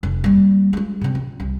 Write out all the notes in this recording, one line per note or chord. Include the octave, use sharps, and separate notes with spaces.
F1
G3 A#3
G#3 F4
C3 C4
F4
C2